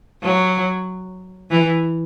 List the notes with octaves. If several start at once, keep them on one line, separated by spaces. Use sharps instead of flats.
F#3
E3